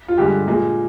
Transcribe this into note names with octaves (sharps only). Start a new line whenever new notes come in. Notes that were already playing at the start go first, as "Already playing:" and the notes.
F4
G2 D3 G#3 G4
A#2 G#3